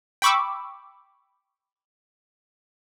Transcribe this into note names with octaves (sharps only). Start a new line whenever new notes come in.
G5 B5 C#6 D6 E6